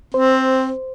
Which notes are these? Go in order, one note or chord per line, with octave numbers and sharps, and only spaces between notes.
C4 C5